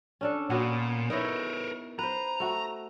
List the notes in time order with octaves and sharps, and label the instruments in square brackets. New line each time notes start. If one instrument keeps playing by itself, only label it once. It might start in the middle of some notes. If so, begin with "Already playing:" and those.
[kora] C#4 D4 A4
[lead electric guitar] A#2 [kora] B3 C#4 F#4
[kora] D#4 E4 C#5 [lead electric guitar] A#4 B4
[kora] B4 C5 [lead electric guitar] A#5
[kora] A3 F#4